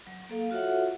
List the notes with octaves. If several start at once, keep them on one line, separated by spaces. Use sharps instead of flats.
F#3
A#3 A4 F5
F4 F#4 A4 C#5 E5 F#5